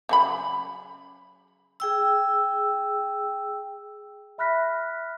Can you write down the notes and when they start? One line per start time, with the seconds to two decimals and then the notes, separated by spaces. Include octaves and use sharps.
0.09 C#3 F#3 B5
1.80 G#4 G5 E6
4.38 E5 B5 F6 F#6 A#6 B6